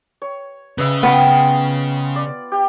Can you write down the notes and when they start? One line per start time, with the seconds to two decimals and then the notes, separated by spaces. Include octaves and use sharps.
0.22 C#5
0.78 C#3 B4 D#5 E5
1.03 B3 F4 D#5 G5
2.16 D5
2.52 G4 G5